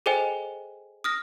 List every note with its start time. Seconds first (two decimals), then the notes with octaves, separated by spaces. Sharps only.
0.06 G#4 A4 C5 D#5 G5 G#5
1.04 D#6 F6 A#6